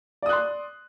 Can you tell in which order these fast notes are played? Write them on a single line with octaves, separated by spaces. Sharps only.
D5 D#6 F#6 C6